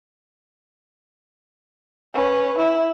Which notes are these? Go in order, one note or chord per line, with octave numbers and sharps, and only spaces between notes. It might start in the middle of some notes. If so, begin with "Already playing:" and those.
C#4 B4
E4